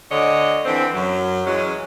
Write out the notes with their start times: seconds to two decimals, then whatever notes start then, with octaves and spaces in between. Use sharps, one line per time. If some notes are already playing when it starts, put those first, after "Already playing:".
0.10 D2 D3 C#5 D#5
0.64 D3 E3 C4
0.94 F#2 F#3
1.46 E3 F#3 G#3 C#4